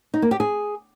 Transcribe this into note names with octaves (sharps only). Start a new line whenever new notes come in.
D#4
A#3
G4
G#4